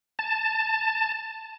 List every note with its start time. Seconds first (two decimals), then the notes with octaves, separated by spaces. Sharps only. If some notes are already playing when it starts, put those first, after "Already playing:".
0.19 A5